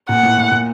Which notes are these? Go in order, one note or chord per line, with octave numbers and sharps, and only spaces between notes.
A#2 F#5
A2
A2
A#2